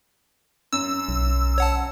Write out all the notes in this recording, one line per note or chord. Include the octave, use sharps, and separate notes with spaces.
F#2 E6
B1
C#5 F#5 A5